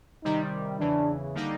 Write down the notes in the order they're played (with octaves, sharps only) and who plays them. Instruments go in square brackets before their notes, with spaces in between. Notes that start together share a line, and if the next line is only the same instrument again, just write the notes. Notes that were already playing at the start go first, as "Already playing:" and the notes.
[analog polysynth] C3 D#3 G3 [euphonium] D#4
[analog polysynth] E2 C#3 E3 [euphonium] D4
[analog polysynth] D3 G3 A#3 D#4